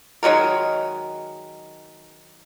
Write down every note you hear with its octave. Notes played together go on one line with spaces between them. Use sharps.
D#3 F#3 G#3 A#4